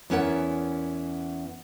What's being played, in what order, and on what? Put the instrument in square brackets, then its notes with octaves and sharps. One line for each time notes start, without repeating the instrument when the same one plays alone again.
[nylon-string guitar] E2 B3 C#4 E4 A#4 F#5